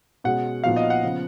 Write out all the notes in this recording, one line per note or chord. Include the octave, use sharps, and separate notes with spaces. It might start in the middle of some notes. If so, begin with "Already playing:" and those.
B2 G#3 C#4 F#4 F#5
A#2 F3 B3 D#4 F#4 F5
D#5
F#5
C#3 F3 B3